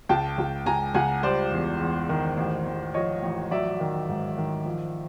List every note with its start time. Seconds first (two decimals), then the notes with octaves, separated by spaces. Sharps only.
0.09 C#2 G5 A5
0.38 C#2
0.66 C#2 G#5 A#5
0.94 C#2 F#5 G#5
1.23 G3 C5 D5
1.51 E2
1.81 E2
2.09 D#3
2.37 A1
2.67 A1
2.94 F3 C#5 D#5
3.22 A1
3.51 F#3 D5 E5
3.80 D#3
4.09 G#2
4.38 D#3
4.66 F3